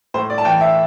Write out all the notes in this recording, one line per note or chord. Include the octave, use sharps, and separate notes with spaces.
A2 C5
D5
A5
E3 G5
E5